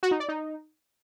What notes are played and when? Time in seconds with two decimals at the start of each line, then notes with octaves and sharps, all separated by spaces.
0.03 F#4
0.11 D#4
0.20 D5
0.29 D#4